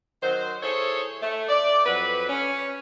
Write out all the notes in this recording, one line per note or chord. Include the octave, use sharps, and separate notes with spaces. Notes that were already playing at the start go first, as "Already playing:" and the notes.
D#3 F#3 C5
E4 G#4 A4 C5 C#5
A3
D5
F2 F#3 B4
C#4